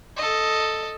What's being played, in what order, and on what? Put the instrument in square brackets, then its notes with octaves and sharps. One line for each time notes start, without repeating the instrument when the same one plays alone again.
[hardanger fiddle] A4 D#5